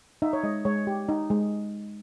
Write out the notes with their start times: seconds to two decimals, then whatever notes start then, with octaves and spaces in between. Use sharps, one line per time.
0.22 D#4 E5
0.33 C#5
0.43 G#3 D#5
0.65 G#3 C#5
0.87 G4
1.09 D#4
1.30 G#3